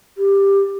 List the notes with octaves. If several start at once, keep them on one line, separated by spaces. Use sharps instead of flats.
G4